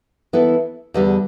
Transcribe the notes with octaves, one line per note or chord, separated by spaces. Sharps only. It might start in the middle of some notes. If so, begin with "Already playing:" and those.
E3 B3 E4 A4
E2 D3 G3